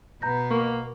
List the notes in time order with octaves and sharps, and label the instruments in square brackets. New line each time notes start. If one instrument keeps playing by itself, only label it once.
[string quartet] B2 B3 [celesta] A#5 G6 A#6
[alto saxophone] A#3 [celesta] C#6